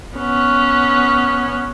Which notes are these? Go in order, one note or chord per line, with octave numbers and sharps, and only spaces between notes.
B3 C#4